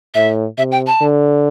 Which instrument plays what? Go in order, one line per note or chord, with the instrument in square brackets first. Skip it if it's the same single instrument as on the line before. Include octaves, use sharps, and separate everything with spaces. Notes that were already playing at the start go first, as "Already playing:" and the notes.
[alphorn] A2 [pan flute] E5
[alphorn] C3 [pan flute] E5
[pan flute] G5
A5
[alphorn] D3